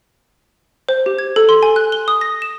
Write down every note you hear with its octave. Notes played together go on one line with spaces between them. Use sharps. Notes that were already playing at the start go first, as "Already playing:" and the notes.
C5
G4
G#6
A4
C6
G#5
F#6
G7
D#6
A#6
E7